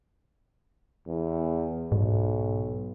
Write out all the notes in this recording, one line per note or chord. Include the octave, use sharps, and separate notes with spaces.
E2
B1 G#2